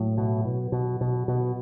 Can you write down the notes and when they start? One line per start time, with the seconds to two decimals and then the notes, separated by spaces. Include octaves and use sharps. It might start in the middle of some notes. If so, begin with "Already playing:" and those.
Already playing: A2 F#3
0.18 B2
0.45 B2
0.72 B2
1.01 B2
1.28 B2